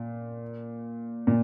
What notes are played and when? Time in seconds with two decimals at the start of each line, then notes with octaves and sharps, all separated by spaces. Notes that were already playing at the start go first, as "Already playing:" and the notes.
Already playing: A#2
1.27 A#2